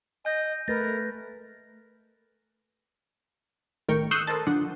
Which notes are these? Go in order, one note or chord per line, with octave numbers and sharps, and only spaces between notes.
D#5 G#5 G6
A3 A#4 B4 A6 A#6
A1 D#3 A3 A#4 G5 C#6
C#6 D#6 E6 F#6 G6 C7
A4 A#4 C5 D#5 A5
D3 F3 D4 F#5